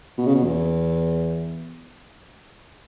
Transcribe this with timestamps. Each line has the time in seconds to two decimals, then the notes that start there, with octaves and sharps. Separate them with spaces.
0.18 B2
0.26 C#3
0.35 B2
0.44 E2